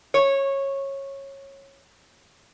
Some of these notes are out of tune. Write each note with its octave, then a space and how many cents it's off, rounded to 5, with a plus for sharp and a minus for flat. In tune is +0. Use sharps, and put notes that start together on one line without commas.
C#5 -15